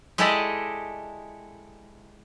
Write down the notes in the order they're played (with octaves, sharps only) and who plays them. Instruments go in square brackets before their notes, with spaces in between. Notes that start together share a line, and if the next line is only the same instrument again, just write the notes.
[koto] G#3 E4 G4 A4 D5 D#5